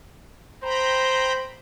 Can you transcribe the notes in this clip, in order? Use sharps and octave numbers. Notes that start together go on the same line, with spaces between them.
C5 G5 A#5 B5